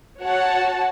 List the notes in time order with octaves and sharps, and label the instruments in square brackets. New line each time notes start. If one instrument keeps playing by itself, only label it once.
[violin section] F#4 C#5 F#5 A5